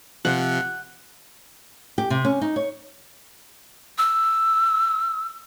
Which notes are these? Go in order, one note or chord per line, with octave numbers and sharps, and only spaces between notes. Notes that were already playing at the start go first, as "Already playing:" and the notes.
C3 F3 F#5
G4
C3
C#4
D#4
C#5
E6